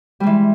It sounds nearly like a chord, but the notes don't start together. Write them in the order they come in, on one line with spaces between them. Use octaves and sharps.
G3 G#3 E3